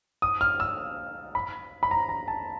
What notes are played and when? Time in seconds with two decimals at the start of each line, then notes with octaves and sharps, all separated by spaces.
0.22 D#6
0.41 F6
0.60 E6
1.35 B5
1.83 B5
1.91 A#5
2.09 A#5
2.28 A5